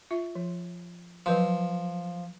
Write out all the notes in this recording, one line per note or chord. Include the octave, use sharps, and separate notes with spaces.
F4 E5
F3
F3 F#3 B4 C6